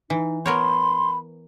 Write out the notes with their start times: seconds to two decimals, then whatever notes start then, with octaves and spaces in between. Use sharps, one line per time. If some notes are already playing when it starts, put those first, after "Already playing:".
0.10 E3 D#4
0.46 B3 A#4 C#5 B5 C6